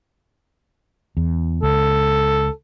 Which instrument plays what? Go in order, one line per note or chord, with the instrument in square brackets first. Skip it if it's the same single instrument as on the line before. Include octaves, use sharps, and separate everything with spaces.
[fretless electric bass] E2
[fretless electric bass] C#2 [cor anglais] A4